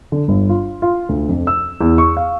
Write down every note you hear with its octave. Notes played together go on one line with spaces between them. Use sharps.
D3
G1
F4
F4
D2
F2
E6
E2
C#6
F5